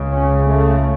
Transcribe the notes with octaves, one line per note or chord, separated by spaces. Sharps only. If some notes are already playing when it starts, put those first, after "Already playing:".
Already playing: C#2 C#3
C#4
A3